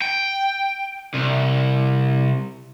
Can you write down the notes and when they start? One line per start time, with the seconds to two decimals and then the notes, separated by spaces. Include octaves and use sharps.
0.02 G5
1.15 C2